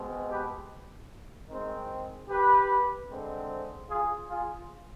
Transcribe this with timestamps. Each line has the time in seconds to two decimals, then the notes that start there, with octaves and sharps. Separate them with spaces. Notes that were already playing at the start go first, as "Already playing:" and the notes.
Already playing: B2 G#3 C4
0.30 G4 B4
1.50 D#3 G#3 C4
2.29 G4 B4
3.09 D3 G#3 C4
3.90 F4 G#4
4.29 F4 G#4